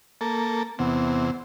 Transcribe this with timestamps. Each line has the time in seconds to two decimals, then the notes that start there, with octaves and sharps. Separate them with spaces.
0.21 A#3 A4
0.79 E2 C3 B3